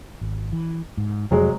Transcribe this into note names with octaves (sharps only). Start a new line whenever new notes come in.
G#1
E3
G#2
F1 F2 F#3 G#3